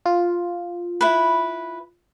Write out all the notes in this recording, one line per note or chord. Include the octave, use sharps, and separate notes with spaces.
F4
E4 B4